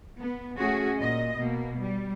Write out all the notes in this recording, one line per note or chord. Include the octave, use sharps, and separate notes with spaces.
B3
A3 C#4 F#4 G#4
A#2 D#5
B2 A#3
G3